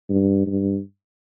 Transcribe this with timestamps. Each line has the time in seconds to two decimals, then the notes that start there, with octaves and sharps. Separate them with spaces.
0.10 G2
0.47 G2